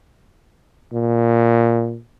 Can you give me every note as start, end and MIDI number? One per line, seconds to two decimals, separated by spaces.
0.93 1.98 46